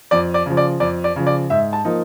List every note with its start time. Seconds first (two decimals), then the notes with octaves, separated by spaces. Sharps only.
0.11 F2 D5
0.34 D5
0.46 C#3 F3
0.57 D5
0.80 F2 D5
1.04 D5
1.16 C#3 F3
1.26 D5
1.50 G#2 E5
1.73 A5
1.85 F3 A#3 D#4